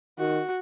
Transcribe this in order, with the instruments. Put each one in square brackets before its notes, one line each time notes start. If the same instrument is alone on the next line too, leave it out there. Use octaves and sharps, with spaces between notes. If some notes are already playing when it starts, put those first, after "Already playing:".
[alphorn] D#3 [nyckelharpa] F#4